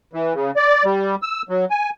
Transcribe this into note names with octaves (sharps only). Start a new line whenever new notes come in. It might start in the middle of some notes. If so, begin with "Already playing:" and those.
E3
C#3
D5
G3
E6
F#3
G#5